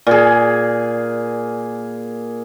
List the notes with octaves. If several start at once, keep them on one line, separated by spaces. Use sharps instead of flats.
A#2 G#4